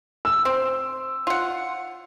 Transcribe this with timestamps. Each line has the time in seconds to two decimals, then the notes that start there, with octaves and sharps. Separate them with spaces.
0.25 E6
0.45 C4
1.27 F4 F#5